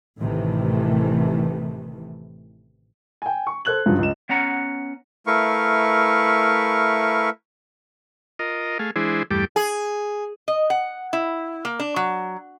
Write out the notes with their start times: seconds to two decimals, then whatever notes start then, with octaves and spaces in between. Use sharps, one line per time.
0.18 A1 A2 C3 D#3 E3 A3
3.22 G5 G#5
3.47 C#6
3.65 A4 C5 F#6 G#6 F#7
3.86 G2 C#3 F3 F#3
3.99 C#2 F4 D#5 E7
4.29 B3 C#4 F#5 A#5
5.27 A3 E4 A#4 B4 F5 C#6
8.39 F4 A#4 D#5
8.79 A3 G#4 F5
8.96 E3 G#3 D4 E4 G#4 C5
9.31 E2 G2 G3 A3 G4 D6
9.56 G#4
10.48 D#5
10.70 F#5
11.13 E4
11.65 A#3
11.80 D4
11.96 F#3